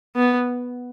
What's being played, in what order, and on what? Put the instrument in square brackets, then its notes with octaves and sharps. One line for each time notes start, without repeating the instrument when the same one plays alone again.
[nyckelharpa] B3